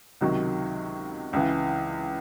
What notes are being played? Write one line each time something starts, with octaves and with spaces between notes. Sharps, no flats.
C#2 C3 D#3 F#3
C#2 C#3 E3